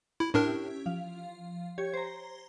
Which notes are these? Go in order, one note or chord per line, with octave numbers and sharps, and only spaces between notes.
E4
A2 C#4 D4 E4 G4 A#4
F3 F5
G4 C#5 G#6
C5 A#5